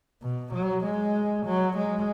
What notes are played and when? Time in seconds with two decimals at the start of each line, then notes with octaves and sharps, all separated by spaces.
0.22 B2
0.53 F#3
0.84 G#3
1.45 F#3
1.77 G#3